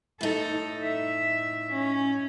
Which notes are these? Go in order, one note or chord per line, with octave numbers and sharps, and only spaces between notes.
A2 D#4 A4
E5
C#4